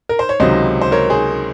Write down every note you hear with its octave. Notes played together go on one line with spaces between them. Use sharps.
A#4
C5
C#5
C#2 C3 D#3 F#3 C5 D#5
C5
A#4 C#5
G#4 C5